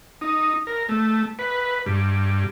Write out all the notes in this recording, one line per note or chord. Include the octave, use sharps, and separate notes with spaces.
D#4
A#4
A3
B4
G2